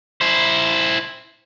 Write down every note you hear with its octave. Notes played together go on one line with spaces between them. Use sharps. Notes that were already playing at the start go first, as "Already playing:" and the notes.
E4 C5